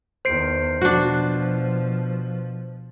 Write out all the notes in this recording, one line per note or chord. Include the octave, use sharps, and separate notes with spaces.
E2 D#3 C5 C7 D7
B2 F3 D4 F#4